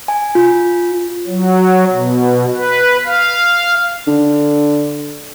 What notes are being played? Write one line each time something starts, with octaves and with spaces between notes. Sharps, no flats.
G#5
F4
F#3
B2
B4
F5
D3